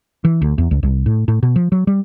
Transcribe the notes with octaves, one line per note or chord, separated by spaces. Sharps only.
E3
D2
E2
C#2
C2
A2
A2
B2
F3
F#3
G3